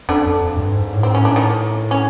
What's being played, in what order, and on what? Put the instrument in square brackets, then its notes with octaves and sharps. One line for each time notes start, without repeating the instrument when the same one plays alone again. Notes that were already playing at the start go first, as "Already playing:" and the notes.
[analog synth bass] F2 [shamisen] D3 D4
[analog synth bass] F2
G2
G#2
A2
[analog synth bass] G#2 [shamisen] C4
[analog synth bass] A2 [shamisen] C#4
[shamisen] D4
D#3 D#4
C#4